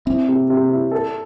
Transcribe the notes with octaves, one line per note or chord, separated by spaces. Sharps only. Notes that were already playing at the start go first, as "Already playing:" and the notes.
C4 E4
C3
C3
E4
A4